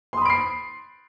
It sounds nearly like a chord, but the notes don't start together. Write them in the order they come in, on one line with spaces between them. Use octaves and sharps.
C6 D#6 B5 D7 C7